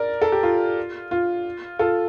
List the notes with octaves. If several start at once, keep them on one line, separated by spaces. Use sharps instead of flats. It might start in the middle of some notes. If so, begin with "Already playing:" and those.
Already playing: A#4 D5
A4
G4
F4
F4
F4 A4